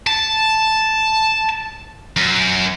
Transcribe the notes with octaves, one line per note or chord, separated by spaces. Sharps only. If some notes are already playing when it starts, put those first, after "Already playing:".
A5
F#2